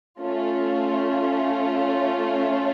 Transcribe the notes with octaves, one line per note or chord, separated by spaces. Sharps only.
A3 C#4 F4